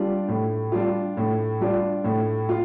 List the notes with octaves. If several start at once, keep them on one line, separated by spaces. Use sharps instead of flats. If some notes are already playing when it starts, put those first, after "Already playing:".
Already playing: G3 D4 F4
A2
G3 D4 F4
A2
G3 D4 F4
A2
F4